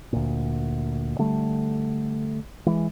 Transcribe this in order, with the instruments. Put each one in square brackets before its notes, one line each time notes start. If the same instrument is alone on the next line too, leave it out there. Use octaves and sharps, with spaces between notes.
[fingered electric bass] D2 A#2
D3 G3 A3
E3 G#3